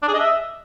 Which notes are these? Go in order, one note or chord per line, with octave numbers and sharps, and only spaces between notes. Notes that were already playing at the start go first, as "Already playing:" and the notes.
D4
G#4
D#5
E5